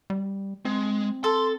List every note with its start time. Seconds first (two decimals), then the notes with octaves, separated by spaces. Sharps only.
0.10 G3
0.65 G#3 C4
1.24 A4 C6